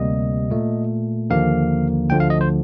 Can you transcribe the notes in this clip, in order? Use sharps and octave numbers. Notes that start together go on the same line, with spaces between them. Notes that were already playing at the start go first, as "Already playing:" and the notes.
Already playing: D2 C3 G3 A#3 D#5
A#2 A3
D#2 D3 F3 A#3 F5
D2 D3 F3 A3 G5
F5
D#5
C5